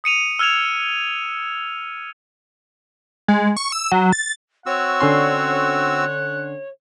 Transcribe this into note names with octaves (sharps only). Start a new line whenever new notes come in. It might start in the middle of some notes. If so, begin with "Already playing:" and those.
D#6 C#7 D#7 F7
E6 F6 G#6 E7 F7
G#3
C#6
E6
F#3
A6
C4 F#4 C#5 F#5 E6
D3 C#4 C6